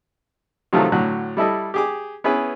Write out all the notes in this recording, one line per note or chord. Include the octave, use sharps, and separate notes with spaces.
C3 D#3 F3 F#3 A3
A2 D3 F#3 F#6
G3 E4 A4 D#5
G4 G#4 D6
B3 C#4 E4 G#4 B4